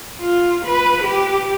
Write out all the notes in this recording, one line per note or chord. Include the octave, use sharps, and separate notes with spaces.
F4
B4
G4